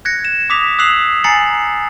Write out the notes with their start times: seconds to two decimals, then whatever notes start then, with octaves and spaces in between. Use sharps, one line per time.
0.05 F#6 G#6 A#6 C#7
0.25 E7
0.50 D6 D#6 B6 F7
0.79 D#6 E6 F#6 C7 F7 F#7
1.24 G#5 A#5 A6 C7 C#7 F#7